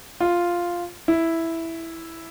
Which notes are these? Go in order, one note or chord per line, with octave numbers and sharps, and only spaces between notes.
F4
E4